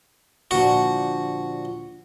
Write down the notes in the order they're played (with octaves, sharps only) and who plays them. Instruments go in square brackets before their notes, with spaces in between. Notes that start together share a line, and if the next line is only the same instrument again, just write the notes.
[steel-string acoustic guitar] A#2 D3 F3 [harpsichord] F#4